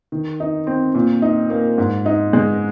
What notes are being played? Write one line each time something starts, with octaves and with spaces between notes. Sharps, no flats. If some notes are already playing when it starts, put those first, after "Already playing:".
D#3
D#4
C4
A#2
D#4
A#3
G#2
D#4
G#3